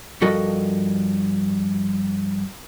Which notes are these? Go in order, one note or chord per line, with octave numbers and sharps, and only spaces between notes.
G2 F3 F#4 A4 A#4 D#5